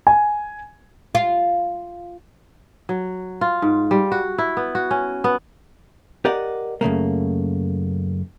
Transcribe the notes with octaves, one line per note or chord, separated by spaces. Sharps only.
G#5
F4
F#3
F4
G#2
G3
F#4
E4
B3
F#4
C#4
B3
G4 A#4 D5 D#5 F#5
F#2 C#3 A3 A#3